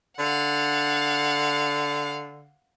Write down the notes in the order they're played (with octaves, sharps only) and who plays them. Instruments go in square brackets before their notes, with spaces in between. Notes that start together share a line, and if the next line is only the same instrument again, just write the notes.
[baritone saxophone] D3 [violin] F5 F#5